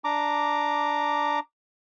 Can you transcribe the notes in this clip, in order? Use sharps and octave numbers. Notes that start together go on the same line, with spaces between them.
D4 A#5 D6